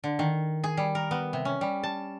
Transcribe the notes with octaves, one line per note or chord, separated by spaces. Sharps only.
D3
D#3
G#4
G3
A#4
B3
C3
C#4
G3
A5